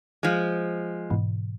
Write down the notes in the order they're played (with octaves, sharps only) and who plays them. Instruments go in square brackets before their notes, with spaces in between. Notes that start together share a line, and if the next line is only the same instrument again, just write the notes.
[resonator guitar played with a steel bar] F3 G#3
[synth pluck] G#2 B2 E3